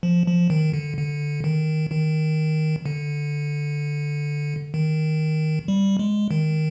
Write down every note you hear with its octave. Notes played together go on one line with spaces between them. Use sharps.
F3
F3
D#3
D3
D3
D#3
D#3
D3
D#3
G3
G#3
D#3